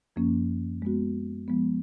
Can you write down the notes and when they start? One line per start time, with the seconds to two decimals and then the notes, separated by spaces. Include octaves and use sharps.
0.16 F#2 F3 A#3 C#4
0.82 G#3 B3 F#4
1.48 F3 G#3 B3